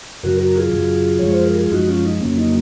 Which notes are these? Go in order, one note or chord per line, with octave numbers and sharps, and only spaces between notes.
F#2 C#3 F#3 F#4 A#4
F#4 A#4
F4 G#4
F#2 C#3 F#3
F#2 F3 G#3 C#5
C5
A#4
G#4
F#2 F3 G#3 D#4 F#4
C#4 F4
D#4
F2 C#3 F#3 A#3 C#4
D#4